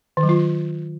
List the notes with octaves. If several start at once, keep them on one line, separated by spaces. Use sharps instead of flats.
D#3
F#3
F4